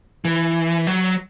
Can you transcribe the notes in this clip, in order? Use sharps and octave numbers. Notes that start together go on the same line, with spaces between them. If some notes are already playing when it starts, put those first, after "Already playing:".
E3
F#3